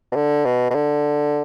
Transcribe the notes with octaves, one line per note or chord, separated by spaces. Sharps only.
B2
D3
B2
B2
D3